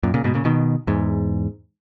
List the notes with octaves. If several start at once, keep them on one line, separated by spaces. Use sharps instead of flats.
F#2 A#2
A#2 C#3
G#2 B2
A#2 C#3
B2 D#3
E2 G#2